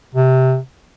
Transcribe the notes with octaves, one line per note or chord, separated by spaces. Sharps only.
C3